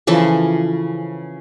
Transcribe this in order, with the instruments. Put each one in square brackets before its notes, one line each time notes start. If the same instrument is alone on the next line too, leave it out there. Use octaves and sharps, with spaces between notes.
[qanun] C#3 E3 F3 A4